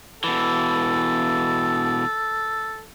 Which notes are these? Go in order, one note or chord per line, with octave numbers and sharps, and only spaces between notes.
B2 E3 A4